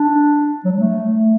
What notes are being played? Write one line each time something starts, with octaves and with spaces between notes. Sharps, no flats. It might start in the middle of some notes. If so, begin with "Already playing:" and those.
Already playing: D4
F#3
G3
A3